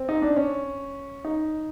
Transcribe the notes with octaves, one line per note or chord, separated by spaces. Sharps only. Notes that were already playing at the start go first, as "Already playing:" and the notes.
Already playing: C4
D#4
D4
C#4
D#4